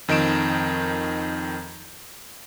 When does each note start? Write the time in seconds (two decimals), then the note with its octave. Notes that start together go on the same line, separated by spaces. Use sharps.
0.08 F2 D#3 D#4 D7 E7